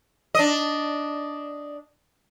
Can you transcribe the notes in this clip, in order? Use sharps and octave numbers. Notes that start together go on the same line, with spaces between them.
D4 D#5